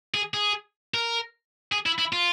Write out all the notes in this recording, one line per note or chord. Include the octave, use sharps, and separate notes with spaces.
G#4
G#4
A#4
G#4
E4
E4
F4